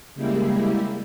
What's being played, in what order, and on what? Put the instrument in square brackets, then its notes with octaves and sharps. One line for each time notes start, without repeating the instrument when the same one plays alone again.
[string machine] C#3 G3 G#3 A#3 E4 G4